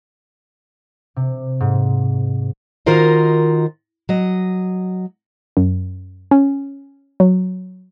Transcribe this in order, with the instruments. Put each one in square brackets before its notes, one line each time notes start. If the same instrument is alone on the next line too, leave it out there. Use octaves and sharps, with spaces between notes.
[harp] C3
G#2
[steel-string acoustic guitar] D#3 F4 F#4 A#4 C5 D#5
F#3 D#5
[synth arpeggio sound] F#2
C#4
F#3